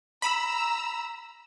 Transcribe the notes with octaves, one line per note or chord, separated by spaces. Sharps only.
A#5 B5 E6